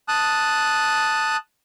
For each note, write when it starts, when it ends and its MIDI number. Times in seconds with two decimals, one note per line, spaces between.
0.08 1.36 81
0.08 1.36 87
0.08 1.36 90